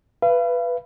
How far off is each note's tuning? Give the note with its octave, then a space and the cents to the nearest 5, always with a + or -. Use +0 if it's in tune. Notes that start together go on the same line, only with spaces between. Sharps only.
B4 +0 F5 -40